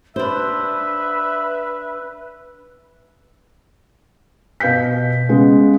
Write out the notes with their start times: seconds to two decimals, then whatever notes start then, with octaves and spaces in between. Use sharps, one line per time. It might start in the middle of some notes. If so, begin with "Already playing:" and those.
0.16 D4 B4 C5 E5
4.60 B2 B4 F5 G6 B6
5.29 C#3 G#3 B3